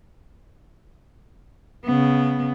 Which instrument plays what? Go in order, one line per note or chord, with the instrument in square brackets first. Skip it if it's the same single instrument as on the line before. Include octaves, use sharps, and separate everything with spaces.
[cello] C#3 B3